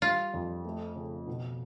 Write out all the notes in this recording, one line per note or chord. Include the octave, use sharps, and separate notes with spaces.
G3 F4
F2
A3
C#3
B2